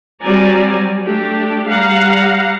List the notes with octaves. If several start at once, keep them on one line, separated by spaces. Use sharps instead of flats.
F#3 G3 C4 D5 G#5 A#5
A3 D4 G4
G3 F5 F#5 A#5